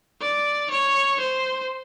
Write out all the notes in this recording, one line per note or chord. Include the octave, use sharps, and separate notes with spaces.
D5
C#5
C5